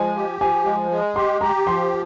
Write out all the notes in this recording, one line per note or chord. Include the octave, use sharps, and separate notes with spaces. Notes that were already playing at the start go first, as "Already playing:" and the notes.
Already playing: F3 G#3 G#5
G4
F3 G#5
G#3
G#3
G4 C6
G4 A#5
F3 C6